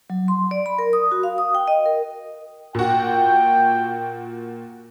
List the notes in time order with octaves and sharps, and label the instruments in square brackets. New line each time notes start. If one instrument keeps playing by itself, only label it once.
[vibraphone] F#3
C6
D5
B5
A#4
D#6
F#4
F5
D#6
G5
D#5
A#4
[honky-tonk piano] A#2 F#4 [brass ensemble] G5